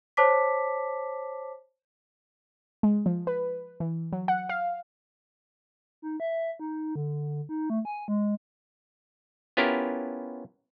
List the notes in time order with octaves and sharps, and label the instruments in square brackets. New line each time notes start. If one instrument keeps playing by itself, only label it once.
[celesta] C5 C#5 A5 D6 B6
[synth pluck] G#3
F3
B4
E3
F#3
F#5
F5
[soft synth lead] D#4
E5
D#4
D3
D#4
A3
G#5
G#3
[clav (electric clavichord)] B3 C#4 E4 F4 G4 A#4